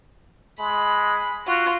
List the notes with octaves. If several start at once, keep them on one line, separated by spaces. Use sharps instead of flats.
G#3 B5
F4 F#4